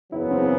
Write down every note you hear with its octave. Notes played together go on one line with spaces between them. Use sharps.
F#1 E2 C#3 F#3 B3 E4
C4